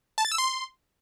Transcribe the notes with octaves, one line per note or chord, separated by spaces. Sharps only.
A5
A6
E6
C6